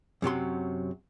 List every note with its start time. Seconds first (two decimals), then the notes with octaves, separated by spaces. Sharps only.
0.22 F#2 C3 F#3 C6